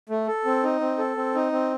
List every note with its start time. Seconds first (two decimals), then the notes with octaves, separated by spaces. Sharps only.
0.10 A3
0.27 A4
0.45 C4
0.63 D#4
0.81 C4
0.98 A4
1.17 C4
1.35 D#4
1.52 C4